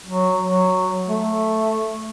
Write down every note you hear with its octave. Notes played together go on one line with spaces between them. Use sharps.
F#3
F#3
A3